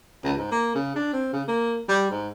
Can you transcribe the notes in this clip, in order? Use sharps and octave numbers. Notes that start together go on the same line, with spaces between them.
C#2
G#2
A#3
C#3
D4
C4
C#3
A#3
G3
G#2